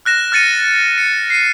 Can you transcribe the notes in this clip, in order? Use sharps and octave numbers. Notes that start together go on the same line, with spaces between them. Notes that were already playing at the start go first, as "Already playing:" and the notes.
F6 F#6 A#6 E7
F6 F#6 A6 C#7 D#7
C#7
C7 D#7